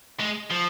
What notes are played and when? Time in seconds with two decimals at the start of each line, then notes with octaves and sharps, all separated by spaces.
0.20 G#3
0.50 F3